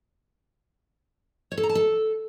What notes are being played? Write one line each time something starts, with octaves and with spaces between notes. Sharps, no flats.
C#5
A4
A#5
A5
A4